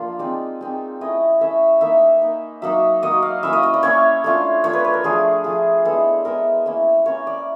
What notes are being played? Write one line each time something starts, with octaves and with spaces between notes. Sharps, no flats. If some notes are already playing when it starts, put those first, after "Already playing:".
Already playing: F3 A#3 D4 F4
G#3 C4 D#4 D5
G#3 C4 D#4
A3 C#4 E4 D#5
A3 C#4 E4 E5
A#3 D#4 E5
A#3 D#4
F#3 A#3 D#4 E5
F#3 A#3 D#4 D#5
F5
A#3 C#4 E4 E5
D#5
D#5
D5
A#3 C#4 E4 C#5
A3 D4 F4
A3 D4 F4 C#5
B4
B4
A#4
F3 A3 D4 G#4
F3 A3 D4 G#4
G#3 B3 E4 A4
G#3 B3 E4 A#4
A#3 C#4 E4
A#3 C#4 E4 C#5
D5